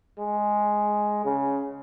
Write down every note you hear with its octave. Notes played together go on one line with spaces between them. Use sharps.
G#3
C#3